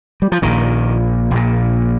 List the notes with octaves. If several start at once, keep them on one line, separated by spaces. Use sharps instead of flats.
G3
F3
A#1 A#2 D#3
A#1 A#2